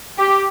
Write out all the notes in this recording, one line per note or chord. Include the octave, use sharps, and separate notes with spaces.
G4